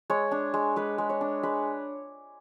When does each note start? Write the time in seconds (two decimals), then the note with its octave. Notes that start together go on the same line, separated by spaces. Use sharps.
0.10 G#3 C#5
0.31 D4
0.54 G#3
0.76 G#3 B4
0.98 G#3
1.10 C#5
1.21 D4
1.43 G#3 B4